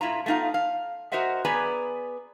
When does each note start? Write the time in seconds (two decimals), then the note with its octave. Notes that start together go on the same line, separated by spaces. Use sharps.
0.01 A2 E4 F4 A#5
0.26 A3 B3 D#4 F4 F5
0.54 F5
1.12 F#4 A#4 C5 D#5 E5 F#5
1.45 B3 G#4 B4 D5 G#5 A#5